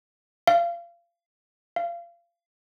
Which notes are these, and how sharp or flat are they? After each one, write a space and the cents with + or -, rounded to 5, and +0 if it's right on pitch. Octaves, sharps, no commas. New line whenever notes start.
F5 -25
F5 -25